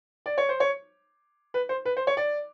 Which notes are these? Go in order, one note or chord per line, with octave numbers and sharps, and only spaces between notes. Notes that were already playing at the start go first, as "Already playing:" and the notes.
D5
C#5
C5
C#5
B4
C5
B4
C5
C#5
D5